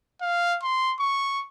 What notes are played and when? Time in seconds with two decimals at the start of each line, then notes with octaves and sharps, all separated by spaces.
0.21 F5
0.63 C6
0.99 C#6